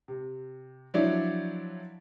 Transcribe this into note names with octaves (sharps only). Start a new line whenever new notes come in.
C3
F3 F#3 D4 E4 C#5 D5